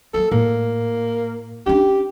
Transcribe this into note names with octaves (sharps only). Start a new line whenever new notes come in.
F#3 A#3 A4
A2 A#3
C#4 D4 G4